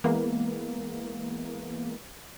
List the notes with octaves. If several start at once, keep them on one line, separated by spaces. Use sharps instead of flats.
E3 G#3 A#3 B3